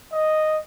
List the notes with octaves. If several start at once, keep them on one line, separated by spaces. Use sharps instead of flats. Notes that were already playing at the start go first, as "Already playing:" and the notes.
D#5